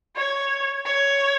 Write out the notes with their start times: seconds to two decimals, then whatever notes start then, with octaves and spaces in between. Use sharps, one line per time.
0.15 C#5
0.85 C#5